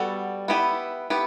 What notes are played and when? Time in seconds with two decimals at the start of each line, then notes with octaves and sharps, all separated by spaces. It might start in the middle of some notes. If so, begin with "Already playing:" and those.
Already playing: G3 B3 F#4 A4
0.48 B3 E4 G4 B4
1.10 B3 E4 G4 B4